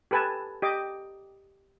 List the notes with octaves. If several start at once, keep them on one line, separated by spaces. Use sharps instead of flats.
G4 A4 B4 G#5 A5
G4 D#5 D6